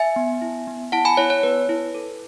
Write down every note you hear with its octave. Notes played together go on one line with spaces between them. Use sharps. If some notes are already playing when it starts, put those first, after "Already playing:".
Already playing: E5 G#5
B3
E4
B3
E4 F#5 A5
G#5 B5
E4 C#5
C#5
B3 B4
E4
A4